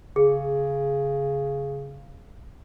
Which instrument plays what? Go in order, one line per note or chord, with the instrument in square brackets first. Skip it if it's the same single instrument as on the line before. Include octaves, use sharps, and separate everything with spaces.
[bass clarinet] C#3 [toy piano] G#4